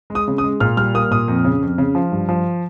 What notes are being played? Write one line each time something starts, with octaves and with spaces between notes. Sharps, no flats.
G#3
D#6
C#3
D#6
G#3
A#2 F6
G3 F6
A#3 D#6
A#2 D#6
F2
C#3
F2
C#3
F3
G2
F3